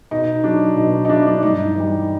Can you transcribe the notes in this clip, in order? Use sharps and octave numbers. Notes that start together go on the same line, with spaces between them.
B2 D#4
F#3 D4
B2 D#4
D#4
D#4
F#3 D4 E4
D4
G2 D#4
E3 G3